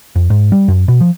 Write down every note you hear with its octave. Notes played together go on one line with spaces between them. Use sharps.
F2
G#2
G3
F#2
B2
F3